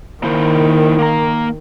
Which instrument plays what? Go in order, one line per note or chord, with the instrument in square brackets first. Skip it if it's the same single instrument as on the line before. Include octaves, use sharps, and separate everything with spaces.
[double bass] D#3 [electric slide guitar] A#3 E4 C5
[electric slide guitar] A#3 A#5